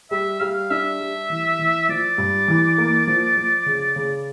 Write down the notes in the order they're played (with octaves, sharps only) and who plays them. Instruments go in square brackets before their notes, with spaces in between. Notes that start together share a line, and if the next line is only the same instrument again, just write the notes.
[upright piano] G3 [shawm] E5
[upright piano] G3 [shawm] F5
[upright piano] D4 [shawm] E5
[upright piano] G3
E3
E3
[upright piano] F3 [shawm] D5
[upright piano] G2
E3
A#3
F3
F3
C#3
C#3